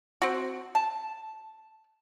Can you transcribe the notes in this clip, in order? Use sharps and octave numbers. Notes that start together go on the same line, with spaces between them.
C4 F#4
A5